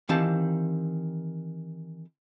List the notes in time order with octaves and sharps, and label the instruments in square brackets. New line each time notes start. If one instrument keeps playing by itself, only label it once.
[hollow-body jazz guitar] D#3 E3 C4 G4 F5 A5